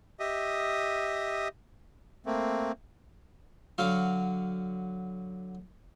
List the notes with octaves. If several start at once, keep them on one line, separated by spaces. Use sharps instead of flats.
G4 D#5 E5 D#6
A3 A#3 C4
D3 F#3 F#4 F5